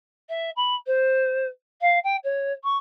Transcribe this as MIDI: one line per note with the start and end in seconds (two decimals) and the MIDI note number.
0.29 0.51 76
0.56 0.75 83
0.87 1.47 72
1.81 1.99 77
2.04 2.17 79
2.24 2.53 73
2.64 2.78 85